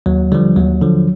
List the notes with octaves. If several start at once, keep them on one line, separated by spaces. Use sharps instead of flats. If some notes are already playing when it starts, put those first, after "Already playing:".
D#2 F#3
D3 F3 G3
D#2 F#3
D3 F3